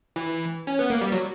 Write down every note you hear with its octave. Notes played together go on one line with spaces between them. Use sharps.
E3
C#4
B3
A#3
G3
F#3